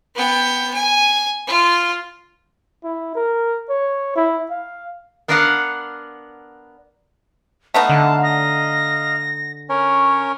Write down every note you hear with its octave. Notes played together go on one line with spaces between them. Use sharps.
B3 G5
G#5
F4
E4
A#4
C#5
E4
F5
B3 D4 A#4 B4 F5 F#5
A3 B3 D#4 F5 A5
D3 A5
D#5 F5 A#6
C#4 A#4 C#5